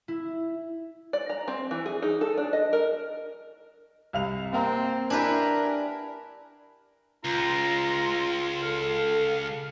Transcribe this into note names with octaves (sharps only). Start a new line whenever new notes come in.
E4
D5
A#5
C4
E3
G#4
D#4
A4
D4
D#5
A#4
C2 F5 F7
A#3 C4 F5 A#5
D4 E4 G4 A#4 B4 G#5
C#2 F4 A#5
A4 F5